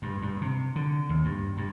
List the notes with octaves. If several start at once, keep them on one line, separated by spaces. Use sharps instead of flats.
G2
G2
C3
D3
D#2
G2
G2